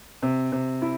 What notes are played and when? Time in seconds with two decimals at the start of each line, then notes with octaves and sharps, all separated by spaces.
0.23 C3
0.52 C3
0.82 E4